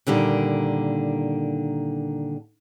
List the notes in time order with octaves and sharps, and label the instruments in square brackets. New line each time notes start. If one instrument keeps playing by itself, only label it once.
[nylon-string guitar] A#2 D3 D#3 G3